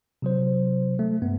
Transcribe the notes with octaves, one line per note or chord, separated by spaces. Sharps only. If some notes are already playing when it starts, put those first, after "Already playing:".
C3 F#3 C5
A3
G2 B3